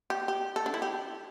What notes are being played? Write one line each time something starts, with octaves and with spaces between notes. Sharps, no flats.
G4
G4
A4
D4
E4
G4